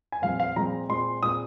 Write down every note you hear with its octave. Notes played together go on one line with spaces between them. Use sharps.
G#5
A#2 F3 G#3 C4 F5
F5
A#2 F3 G#3 C4 A#5
A#2 G#3 C4 C6
A#2 G#3 C4 D#6